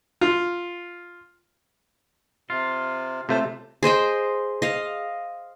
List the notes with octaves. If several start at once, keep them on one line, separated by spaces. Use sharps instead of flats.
F4
C3 F4
A2 C3 A3 F4 C5 A5
G#4 C5 D#5 G5
D#5 F5